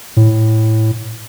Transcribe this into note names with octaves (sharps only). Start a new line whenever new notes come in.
A2